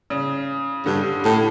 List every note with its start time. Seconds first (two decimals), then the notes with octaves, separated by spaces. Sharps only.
0.10 C#3
0.86 G2 D3
1.25 A2